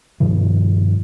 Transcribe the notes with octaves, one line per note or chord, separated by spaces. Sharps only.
G2 B2 D#3 F3